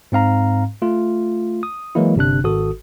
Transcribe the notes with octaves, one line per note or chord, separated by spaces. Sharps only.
G#2 C4 F5 A#5
A3 F4
D#6
E3 F#3 G#3 A#3 E4
G1 C3 D4 F#6
G#1 F#4 A4 D#6